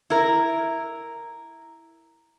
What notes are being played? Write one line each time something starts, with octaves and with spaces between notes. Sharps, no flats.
E4 A#4